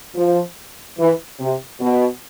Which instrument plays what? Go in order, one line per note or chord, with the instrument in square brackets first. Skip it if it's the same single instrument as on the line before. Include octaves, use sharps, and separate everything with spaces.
[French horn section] F3
E3
C3
B2